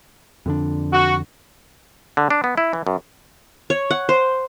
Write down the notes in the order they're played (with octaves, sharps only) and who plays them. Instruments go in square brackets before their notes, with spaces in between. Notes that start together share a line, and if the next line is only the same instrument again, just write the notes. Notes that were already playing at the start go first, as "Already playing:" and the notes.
[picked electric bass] F2 D3 D4
[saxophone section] F#4
[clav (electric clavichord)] D3
D4
B3
E4
E3
F#2
[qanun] C#5
F#5
C5